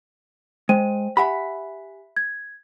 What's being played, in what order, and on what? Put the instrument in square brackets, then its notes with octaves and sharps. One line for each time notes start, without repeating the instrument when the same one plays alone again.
[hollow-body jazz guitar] G#3 [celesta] C5 G5 D#7
[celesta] G4 G#5 [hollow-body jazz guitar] E5 F#5 B5
[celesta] G#6